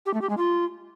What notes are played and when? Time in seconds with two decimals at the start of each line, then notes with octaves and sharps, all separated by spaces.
0.06 G4
0.14 A3
0.22 G4
0.30 G#3
0.37 F4